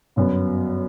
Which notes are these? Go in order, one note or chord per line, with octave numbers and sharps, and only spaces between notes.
G1 F#2 F#3 B3